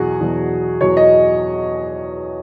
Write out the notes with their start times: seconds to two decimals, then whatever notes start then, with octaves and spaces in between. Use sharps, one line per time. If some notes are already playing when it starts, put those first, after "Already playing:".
Already playing: E2 B2 F#3 F#4 G#4
0.20 E2 B2 F#3
0.81 E2 B2 F#3 C#5
0.97 D#5